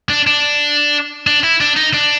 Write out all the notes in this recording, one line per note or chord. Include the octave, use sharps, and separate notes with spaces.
D4
D4
D4
E4
D4
D#4
D4